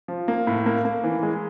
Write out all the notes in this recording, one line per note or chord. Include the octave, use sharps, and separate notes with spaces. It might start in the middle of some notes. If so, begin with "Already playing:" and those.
F3
A#3
A2
A#3
A#3
E3
G#3